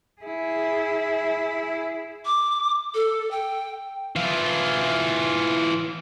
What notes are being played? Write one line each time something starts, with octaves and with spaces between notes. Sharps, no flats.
E4 G#4
D6
A4
G5
E3 F4